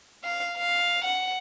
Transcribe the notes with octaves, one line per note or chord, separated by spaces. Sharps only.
F5
F5
F#5